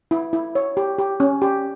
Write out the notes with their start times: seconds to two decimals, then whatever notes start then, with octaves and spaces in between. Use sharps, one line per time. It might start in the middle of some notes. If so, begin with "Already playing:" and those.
0.11 E4
0.33 E4
0.55 C#5
0.77 G4
0.99 G4
1.20 C#4
1.42 G4